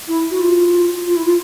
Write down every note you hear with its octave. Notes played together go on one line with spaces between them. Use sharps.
E4
F#4
F4
F4
E4
F4